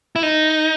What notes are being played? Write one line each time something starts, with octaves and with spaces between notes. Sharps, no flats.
E4
D#4